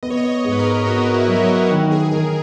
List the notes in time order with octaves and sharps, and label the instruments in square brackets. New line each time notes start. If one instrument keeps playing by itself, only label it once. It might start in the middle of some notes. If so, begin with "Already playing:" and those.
[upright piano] B3 [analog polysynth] D#5
[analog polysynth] C#5
D#5
C#5
[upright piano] G#2
[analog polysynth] B4
A#4
[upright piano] B3 [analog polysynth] F#4
[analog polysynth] E4
[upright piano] F#3
[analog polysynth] E4
F#4
[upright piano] D#3
[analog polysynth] G#4
[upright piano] D#3 [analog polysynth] A#4